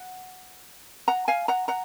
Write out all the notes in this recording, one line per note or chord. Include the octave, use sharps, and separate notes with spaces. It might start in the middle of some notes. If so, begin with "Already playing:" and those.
Already playing: F#5
F#5 A#5
F5 G#5
F#5 A#5
F#5 A#5